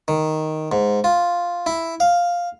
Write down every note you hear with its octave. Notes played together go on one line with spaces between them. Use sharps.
D#3
G#2
F4
E4
F5